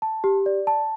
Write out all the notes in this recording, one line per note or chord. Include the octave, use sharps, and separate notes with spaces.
A5
G4
D5
A5